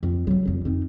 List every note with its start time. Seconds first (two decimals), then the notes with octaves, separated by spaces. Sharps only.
0.03 F2 F3
0.27 A2 F#3
0.45 F1 F2
0.65 F2 D#4